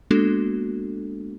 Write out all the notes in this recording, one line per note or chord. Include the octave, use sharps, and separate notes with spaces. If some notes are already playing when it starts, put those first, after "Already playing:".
G#3 A#3 B3 D4 F#4 A4